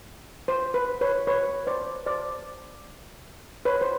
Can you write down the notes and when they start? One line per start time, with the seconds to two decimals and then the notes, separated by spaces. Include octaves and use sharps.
0.48 C5
0.74 B4
1.01 B4 C#5
1.27 B4 C#5
1.67 C5 D5
2.06 C5 D5
3.65 B4 C#5
3.81 C5